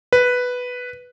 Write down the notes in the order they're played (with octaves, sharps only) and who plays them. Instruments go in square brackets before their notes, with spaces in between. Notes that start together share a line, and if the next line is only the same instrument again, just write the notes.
[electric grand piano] B4